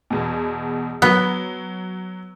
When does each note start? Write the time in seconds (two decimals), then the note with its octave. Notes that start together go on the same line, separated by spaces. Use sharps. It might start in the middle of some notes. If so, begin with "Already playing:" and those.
0.10 E2 B2
1.02 F#3 B3